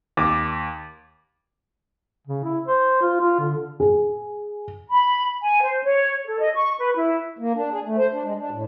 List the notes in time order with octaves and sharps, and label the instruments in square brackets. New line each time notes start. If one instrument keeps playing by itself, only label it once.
[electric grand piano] D#2 [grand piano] D6
[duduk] C#3
E4
C5
F4
F4
D3
[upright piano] G#4
[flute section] B5
G#5
C5
C#5
A4
D#5
C#6
B4
E4
[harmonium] A#3
D4
G#4
A3
C5
D4
G#3
D4
A2